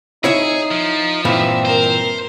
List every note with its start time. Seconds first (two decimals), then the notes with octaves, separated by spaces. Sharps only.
0.24 D#4 E4 G#4 C#5 E5
0.71 F3
1.25 G2 A#2 E3 C4 E5
1.65 A#4 C5